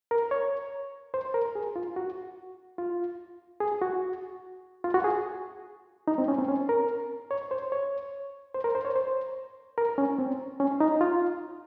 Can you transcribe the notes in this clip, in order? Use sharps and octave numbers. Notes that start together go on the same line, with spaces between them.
A#4
C#5
C5
A#4
G#4
F4
F#4
F4
G#4
F#4
F4
F#4
G#4
D#4
C4
C#4
C4
C#4
A#4
C#5
C5
C#5
C5
A#4
C5
C#5
C5
A#4
C#4
C4
C#4
D#4
F4